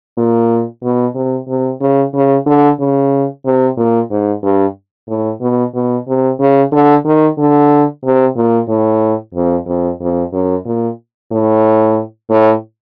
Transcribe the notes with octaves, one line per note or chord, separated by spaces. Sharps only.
A#2
B2
C3
C3
C#3
C#3
D3
C#3
C3
A#2
G#2
G2
A2
B2
B2
C3
C#3
D3
D#3
D3
C3
A#2
A2
F2
F2
F2
F#2
A#2
A2
A2